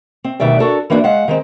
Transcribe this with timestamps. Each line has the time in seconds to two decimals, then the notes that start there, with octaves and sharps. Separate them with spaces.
0.24 C4
0.40 D2 B2 D#3 G3 D5 E5
0.59 D4 F#4 A4 A#4
0.90 E3 A#3 B3 D4 F#4
1.04 G#3 F5 F#5
1.28 D#3 G#3 C4